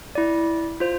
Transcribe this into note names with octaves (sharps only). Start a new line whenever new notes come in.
E4 D5
F4 C5